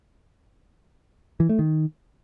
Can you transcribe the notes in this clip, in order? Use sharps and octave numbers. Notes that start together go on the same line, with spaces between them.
E3
A3
D#3